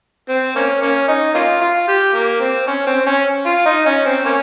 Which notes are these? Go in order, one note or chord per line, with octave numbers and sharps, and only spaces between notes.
C4
A#3 C#4
A#3 C#4
D#4
A#3 C#4 F4
F4
G4
A#3
C4
C#4
C4
C#4
F4
D#4
C#4
C4
A#3 C#4